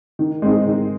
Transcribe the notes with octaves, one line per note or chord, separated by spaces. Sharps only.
D#3
G#3 C4 D#4 G#4
D#3